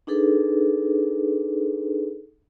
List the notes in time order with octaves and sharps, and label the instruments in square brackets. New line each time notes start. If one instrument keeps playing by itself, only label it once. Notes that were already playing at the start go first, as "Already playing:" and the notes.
[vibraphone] D4 D#4 G#4 A4 B4